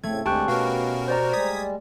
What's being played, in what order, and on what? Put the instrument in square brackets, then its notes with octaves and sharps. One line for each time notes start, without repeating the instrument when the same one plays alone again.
[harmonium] A2 C#3 C4 [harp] A3 [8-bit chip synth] G#6
[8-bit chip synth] D2 [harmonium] D3 G#3 C4 [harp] G4 [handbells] A5 C#6 F#6
[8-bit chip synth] B2 F#4 A#4 [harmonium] B3 C#4 B4 [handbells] F5
[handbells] C5 D5 A#5
[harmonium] G3 G#3 [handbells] D5 [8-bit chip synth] D#6 G#6 B6